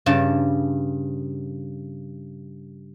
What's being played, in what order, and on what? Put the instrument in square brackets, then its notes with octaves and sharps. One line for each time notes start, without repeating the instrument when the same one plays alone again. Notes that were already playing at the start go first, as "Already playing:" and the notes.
[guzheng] G2 C#3 A5